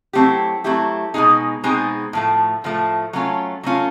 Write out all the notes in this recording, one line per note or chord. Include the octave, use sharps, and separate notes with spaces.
F#3 A3 C4 E4 G4
F#3 A3 C4 E4 G4
B2 G#3 C4 D#4 G#4
B2 G#3 C4 D#4 G#4
A2 F3 A3
A2 F3 A3
F#3 A3 C#4 F4
F#3 A3 C#4 F4